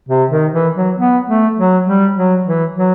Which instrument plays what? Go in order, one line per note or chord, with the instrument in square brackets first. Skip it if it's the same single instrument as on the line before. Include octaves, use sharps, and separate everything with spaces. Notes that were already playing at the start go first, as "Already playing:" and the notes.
[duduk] C3
D#3
E3
F#3
B3
A3
F#3
G3
F#3
E3
F#3